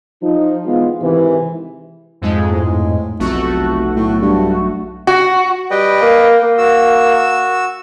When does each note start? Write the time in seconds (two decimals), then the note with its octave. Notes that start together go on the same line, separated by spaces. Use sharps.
0.22 F3 D#4
0.65 E3 G#3 B3 F4
1.01 G#2 C3 D#3 E3
2.22 F2 G#2 G#3
2.51 A2
3.19 F1 B1 A3 F#4
3.96 A2
4.22 G2
5.07 F#4
5.71 G3 B4 D#5 G5
6.01 A#3
6.43 A#3
6.58 F#4 E6